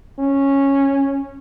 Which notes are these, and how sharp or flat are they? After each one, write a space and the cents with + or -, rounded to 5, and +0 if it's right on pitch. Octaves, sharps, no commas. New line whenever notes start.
C#4 -10